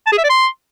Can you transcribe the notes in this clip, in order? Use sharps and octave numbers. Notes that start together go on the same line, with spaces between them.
A5
G#4
E5
D5
C6